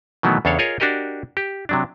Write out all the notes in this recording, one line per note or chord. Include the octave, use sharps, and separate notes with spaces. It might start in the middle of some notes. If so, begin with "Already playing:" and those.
B2 D#3 E3 F#3 A3 B3
E2 C#3 D4 A4 C#5 F5
F4 G#4 A#4 C#5 D#5
D4 F#4 G4 A#4 D#5
G4
C3 F#3 D4